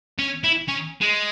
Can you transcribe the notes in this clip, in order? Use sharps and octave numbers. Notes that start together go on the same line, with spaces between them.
C#4
E4
C#4
G#3